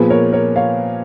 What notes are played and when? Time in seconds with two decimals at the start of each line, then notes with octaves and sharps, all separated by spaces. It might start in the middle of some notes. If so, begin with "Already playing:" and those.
Already playing: A#2 F3 B3 G#4 B4
0.10 A#4 C#5
0.32 A#4 C#5
0.56 C#5 F5